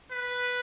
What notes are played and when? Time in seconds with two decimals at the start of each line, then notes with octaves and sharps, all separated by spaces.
0.12 B4